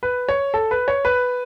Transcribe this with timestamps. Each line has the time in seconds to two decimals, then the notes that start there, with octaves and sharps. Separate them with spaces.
0.03 B4
0.28 C#5
0.54 A4
0.71 B4
0.88 C#5
1.05 B4